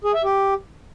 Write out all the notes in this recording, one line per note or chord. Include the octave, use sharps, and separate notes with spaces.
G#4
E5
G4